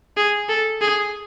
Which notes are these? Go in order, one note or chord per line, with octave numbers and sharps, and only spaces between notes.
G#4
A4
G#4